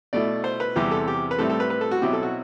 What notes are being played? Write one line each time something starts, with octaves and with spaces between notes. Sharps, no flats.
B2 A3 E4 D5
C5
B4
E2 C3 G3 C4 E4 G4
A4
G4
B4
A2 G3 C4 E4 A4
A4
B4
B4
A4
F#4
B2 F#3 C4 E4 G4
A4
F#4